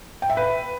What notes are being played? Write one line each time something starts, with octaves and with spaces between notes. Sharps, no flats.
G5
E5
B4